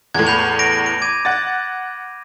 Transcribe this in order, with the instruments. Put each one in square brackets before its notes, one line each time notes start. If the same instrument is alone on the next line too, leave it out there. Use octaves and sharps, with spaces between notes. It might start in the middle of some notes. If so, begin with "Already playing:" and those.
[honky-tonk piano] E2 A2 [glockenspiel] G#6
[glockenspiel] B5 G6 F7
A#6 D7
D7
D6 G#6 D#7
[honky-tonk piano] F#5 A6